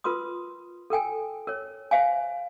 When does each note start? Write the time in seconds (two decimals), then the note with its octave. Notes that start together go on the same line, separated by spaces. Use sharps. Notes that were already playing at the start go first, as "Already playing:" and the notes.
0.04 F4 A#4 B4 C6 D#6
0.90 A4 A#4 G5 G#5
1.47 A#4 C#5
1.91 C5 E5 F5 G#5